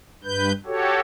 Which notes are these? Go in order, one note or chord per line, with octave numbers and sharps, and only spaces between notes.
G2 B4 G6
F#4 G4 A4 C#5